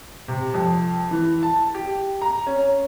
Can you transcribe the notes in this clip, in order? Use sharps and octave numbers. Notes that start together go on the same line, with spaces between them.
C3
F2
E3
A5
G4
A#5
C#4